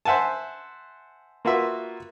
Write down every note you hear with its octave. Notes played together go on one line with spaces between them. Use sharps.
C5 E5 F#5 G#5 A5
A#3 F4 F#4 B4 E5